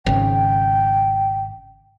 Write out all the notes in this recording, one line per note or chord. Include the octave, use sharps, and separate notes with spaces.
G#1 C#3 G5